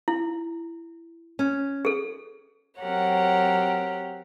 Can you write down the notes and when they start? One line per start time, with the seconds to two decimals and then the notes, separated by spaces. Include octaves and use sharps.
0.08 E4
1.39 C#4
1.85 G#4 A4
2.81 F#3 C4 G4 A#4 C#5 F#5